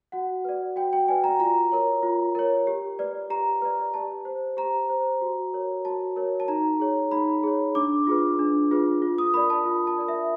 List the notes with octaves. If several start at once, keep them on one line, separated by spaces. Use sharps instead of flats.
F#4 F#5
B4 D5
F#4 G5
G5
B4 D5 G#5
A#5
F4 A#5
A#4 C#5
F4
A#4 C#5
G4
B4 D5
G4 A#5
B4 D5
G4 A5
C5
G4 A#5
C5
F#4
A#4 C#5
F#4 A5
A#4 C#5
A5
D#4 A#5
G#4 C#5
D#4 B5
G#4 C#5
D4 D6
F4 G#4 B4
D4
F4 G#4 B4
F4
D#6
A#4 D5 B5
A5
F4
A5
A#4 D5
E5